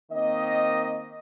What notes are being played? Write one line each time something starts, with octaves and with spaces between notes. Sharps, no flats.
D#3 A#3 C4 D#5